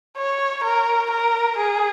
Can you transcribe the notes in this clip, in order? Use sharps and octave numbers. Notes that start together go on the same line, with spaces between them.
C#5
A#4
A#4
G#4